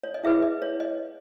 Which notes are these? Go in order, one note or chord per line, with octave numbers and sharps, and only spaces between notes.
C#5
D#5
E4 G#4 B4 E5
D#5
C#5
D#5